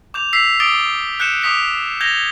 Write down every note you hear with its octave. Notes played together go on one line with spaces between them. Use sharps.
D6 G6 F7
E6 B6 C7 F7
D6 D#6 A6 D7 G7
F#6 G6 C#7 E7
D6 D#6 B6 F7
G6 G#6 A#6 F7 G7